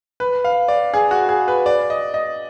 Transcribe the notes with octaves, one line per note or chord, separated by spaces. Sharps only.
B4
F5
D5
G#4
F#4
G#4
B4
D5
D#5
D#5